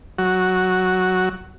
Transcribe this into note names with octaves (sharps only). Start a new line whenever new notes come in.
F#3 F#4